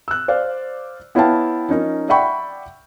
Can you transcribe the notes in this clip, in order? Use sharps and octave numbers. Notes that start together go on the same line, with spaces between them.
E6 F#6
C5 D5 F5
B3 E4 C#5 F5 G5 A5
F3 C#4 D#4 A#4
D5 E5 F#5 G5 B5 C#6